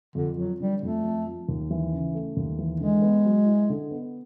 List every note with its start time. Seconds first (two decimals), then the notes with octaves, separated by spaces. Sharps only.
0.15 F2 D3
0.38 F3 F#3
0.60 D3 G3
0.82 F2 A3
1.04 F2
1.27 F3
1.49 D#2
1.71 E3
1.93 C#3
2.15 A3
2.37 D#2
2.59 E3
2.80 D3 G#3
3.02 B3
3.25 F#3
3.46 E4
3.69 D3
3.91 B3